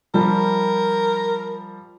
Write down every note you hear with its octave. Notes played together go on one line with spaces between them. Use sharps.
F3 G3 A#4